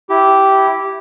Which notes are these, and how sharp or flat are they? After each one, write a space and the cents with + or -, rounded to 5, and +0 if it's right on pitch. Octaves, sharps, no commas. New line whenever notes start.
E4 +0 G4 -10